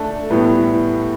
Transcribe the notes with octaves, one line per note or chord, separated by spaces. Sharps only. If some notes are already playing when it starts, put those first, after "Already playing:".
Already playing: A3 D4 A4
A2 E3 G3 B3